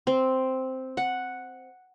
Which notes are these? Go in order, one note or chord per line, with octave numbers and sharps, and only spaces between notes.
C4
F#5